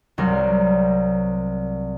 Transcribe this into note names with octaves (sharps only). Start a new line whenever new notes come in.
C2 F#3 G3 A#4 D6